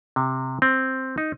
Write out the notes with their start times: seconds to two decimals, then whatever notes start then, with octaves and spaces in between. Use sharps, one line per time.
0.16 C3
0.62 C4
1.18 D#4